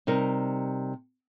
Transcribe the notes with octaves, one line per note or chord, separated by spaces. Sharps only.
C3 G3 D#4 A#4